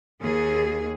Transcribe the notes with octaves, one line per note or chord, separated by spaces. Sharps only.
D#2 G#4